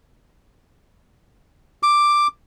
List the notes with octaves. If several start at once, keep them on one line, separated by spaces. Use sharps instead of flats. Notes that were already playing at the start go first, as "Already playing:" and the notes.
D6